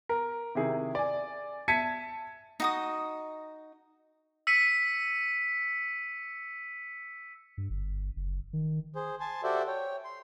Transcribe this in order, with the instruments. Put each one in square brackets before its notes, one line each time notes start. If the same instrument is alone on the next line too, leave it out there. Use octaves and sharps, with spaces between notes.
[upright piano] A#4
C3 D#3 E4 G#4
D5 G#5
E5 A5 G#6 B6 C#7 D#7
[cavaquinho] D#4 F#4 D#6
[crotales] E6 B6 C#7 D#7
[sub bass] G2
G1
F#1
D#3
[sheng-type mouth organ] G#4 C5
G#5 A5 C6
F#4 G4 A4 C5 D5 E5
C#5 G5
C6